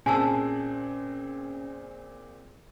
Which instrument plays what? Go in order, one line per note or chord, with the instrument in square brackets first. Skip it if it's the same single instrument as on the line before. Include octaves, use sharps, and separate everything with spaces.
[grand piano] A#2 C4 G#4 [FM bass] C#4 [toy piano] G#5 A5 E6